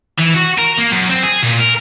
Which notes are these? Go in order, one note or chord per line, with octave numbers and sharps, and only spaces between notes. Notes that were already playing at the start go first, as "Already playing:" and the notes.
E3
F#4
A#4
A#3
F#2
C4
G#4
A#2
A#4